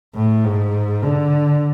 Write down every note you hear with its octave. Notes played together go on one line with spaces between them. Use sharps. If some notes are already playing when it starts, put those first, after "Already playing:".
A2
G#2
D3